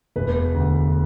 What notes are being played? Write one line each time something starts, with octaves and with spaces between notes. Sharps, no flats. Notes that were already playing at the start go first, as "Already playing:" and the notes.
E1 B4
D2